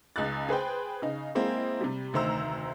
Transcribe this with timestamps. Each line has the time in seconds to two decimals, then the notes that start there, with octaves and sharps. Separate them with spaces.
0.16 C#2 C#3 D#4 F#6 A6
0.49 G#4 B4 C5 G5
1.02 C#3 D#4
1.35 G#3 A#3 C4 E4
1.81 C3 G3
2.13 F1 D2 D#3 C5 A#5 E6